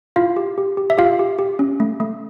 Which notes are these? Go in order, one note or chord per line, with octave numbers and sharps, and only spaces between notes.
E4 F4 F5
G4
G4
G4
E5
F4 G4 F5
G4
G4
C#4
A3
A3